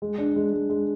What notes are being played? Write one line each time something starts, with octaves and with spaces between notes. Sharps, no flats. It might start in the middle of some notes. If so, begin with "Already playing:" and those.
G#3
D4
G#3
G#3
G#3